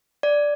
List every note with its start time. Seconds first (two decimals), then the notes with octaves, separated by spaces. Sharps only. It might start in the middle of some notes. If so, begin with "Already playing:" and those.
0.23 D5